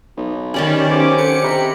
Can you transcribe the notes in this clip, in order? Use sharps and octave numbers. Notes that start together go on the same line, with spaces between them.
B1
D#3 C#4 G4 D5 B5
B1 C5 G#5 D6
D3 C#7
C3 G5 A#5 B5